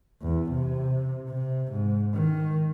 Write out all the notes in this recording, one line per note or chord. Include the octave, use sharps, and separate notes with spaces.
E2
C3
C3
G#2
D#3